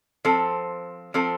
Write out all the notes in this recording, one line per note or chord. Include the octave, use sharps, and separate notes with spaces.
F3 C4 A4
F3 C4 A4